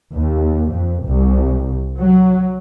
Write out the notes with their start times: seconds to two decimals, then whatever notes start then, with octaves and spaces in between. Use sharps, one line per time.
0.14 D#2
0.72 F2
1.08 C2
1.99 F#3